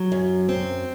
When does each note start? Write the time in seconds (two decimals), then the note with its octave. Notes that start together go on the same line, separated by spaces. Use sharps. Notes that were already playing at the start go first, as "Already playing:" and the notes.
Already playing: F#3
0.12 F#2
0.49 C4